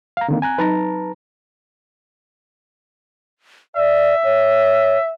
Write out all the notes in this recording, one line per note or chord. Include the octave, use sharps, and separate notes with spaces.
F5 A#5
D3 D#3 A#3 C4
G#5 A#5 F#6
F#3 D#4 B4 D#5 A5 A#5
D5 E5
C#5